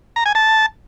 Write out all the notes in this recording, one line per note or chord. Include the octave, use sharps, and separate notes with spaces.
A#5
G#5
A5